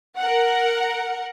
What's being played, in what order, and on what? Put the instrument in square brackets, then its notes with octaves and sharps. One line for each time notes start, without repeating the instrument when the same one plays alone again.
[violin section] A#4 F#5